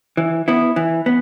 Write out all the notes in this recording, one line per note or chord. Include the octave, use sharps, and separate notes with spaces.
E3
B3 E4
E3
B3